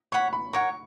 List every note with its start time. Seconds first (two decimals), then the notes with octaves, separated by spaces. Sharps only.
0.12 C#5 F#5 B5 C#6
0.33 B5
0.53 A#4 C#5 F#5 C#6